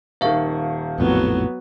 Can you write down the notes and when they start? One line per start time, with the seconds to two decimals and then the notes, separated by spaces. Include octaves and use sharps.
0.21 D#1 D#3 E5 F5 C#6
0.99 A#1 F2 A2 F#3 B3